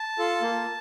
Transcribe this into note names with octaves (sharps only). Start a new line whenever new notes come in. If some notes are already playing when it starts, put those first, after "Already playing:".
Already playing: A5
F4 A4
A#3